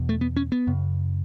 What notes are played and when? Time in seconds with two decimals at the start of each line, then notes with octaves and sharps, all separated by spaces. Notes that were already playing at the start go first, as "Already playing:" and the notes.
Already playing: E2 B2
0.09 A3
0.21 B3
0.36 C#4
0.52 B3
0.67 F#2 C#3